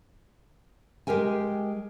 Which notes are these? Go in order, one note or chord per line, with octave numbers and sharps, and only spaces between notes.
G#3 G4 A#4 G5 G#5